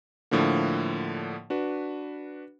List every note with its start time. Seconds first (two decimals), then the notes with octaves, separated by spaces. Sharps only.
0.31 A2 D3 F3 A#3
1.50 D4 F#4 B4